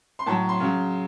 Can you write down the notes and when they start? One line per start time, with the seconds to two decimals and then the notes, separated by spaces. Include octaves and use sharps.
0.19 C6
0.26 A2 F#3 A5
0.49 C6
0.60 C#3 F#3